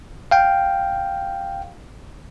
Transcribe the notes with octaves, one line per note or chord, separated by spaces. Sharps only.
F5 G5